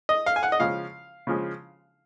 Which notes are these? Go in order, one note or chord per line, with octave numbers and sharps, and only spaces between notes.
D#5
F5
G#5
F#5
D#5
C#3 F3 G#3 F5
C#3 F3 G#3